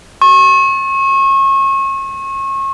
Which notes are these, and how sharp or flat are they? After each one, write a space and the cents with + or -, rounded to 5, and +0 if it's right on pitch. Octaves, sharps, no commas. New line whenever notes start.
C#6 -35